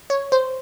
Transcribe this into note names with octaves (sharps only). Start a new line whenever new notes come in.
C#5
C5